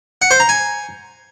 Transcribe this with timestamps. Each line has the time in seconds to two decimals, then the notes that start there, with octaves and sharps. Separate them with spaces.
0.22 F#5
0.31 C5
0.40 A#5
0.49 G#5